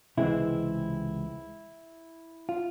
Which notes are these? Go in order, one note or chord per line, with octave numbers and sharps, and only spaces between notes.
C#2 C3 E3 G#3 C4 E4
F4